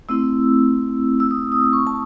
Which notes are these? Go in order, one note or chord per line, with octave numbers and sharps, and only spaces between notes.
A3 C4 E4 E6
E6
D#6
D#6
C#6
A5